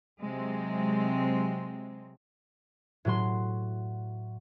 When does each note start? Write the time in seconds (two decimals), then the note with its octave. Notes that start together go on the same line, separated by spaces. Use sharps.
0.20 C3 F#3 G#3 C4
3.05 A2 F#3 C6